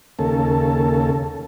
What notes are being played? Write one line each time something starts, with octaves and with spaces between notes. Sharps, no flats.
D#2 C#3 A#3 A4